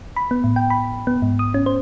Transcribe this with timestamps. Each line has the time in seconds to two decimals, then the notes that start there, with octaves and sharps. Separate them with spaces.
0.16 B5
0.31 B3
0.44 A2
0.56 G5
0.70 B5
1.07 B3
1.22 G#2
1.39 D#6
1.54 C#4
1.66 C5